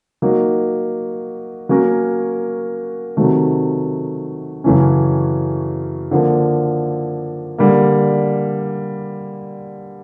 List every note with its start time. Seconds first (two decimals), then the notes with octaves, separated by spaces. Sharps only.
0.22 F#3 A#3 D#4
1.69 F#3 A#3 C#4 F#4 A#4
3.17 C3 D#3 F#3 A3
4.64 F#2 C#3 E3 A3 C#4
6.11 D3 F3 A#3
7.58 D3 G3 A#3